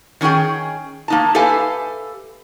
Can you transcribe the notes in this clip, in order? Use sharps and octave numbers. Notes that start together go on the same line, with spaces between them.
D#3 C#4 D4 G#4 G5
A#3 D#4 A5
G4 A4 B4 E5 F5 G#5